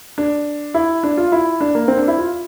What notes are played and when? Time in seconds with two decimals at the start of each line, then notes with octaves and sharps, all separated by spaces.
0.18 D4
0.74 E4
1.03 D4
1.17 F4
1.32 E4
1.61 D4
1.75 A#3
1.88 C4
1.98 D4
2.08 E4
2.18 F4